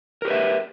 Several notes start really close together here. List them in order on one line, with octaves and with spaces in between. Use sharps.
A#4 G4 B4 E5